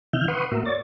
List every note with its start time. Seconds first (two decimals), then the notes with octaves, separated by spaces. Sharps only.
0.13 C3 D#3 E3 E5 F6 G6
0.28 B4 F#5 C6 C#6 D#6
0.51 A2 A#3 F#4 A#4 E5
0.65 C#5 D5 A6